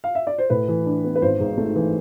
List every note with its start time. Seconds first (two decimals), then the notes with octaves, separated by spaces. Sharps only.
0.04 F5
0.15 E5
0.27 D5
0.38 C5
0.50 A2 B4
0.68 E3
0.86 D4
1.04 B3
1.16 B4
1.22 G#1 C5
1.40 G#2
1.58 A3
1.76 E3